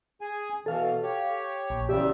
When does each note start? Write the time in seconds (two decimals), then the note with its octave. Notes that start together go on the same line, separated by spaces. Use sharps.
0.21 G#4 G#5
0.66 B2 E3 A4 F5
1.03 G4 C#5
1.70 A#1
1.89 E2 C#3 G4 D5 E5